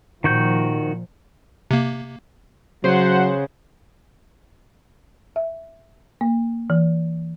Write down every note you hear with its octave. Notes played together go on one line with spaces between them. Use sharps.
A#2 D#3 F3 F#4 G6
C3 A#3
C#3 F#3 C5 F#5 C6
E5
A#3
E3